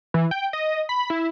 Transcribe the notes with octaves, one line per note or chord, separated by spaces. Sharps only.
E3
G5
D#5
B5
E4